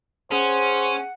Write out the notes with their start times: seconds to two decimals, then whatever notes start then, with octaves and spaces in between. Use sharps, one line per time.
0.32 C#4 G#4 C5 F#5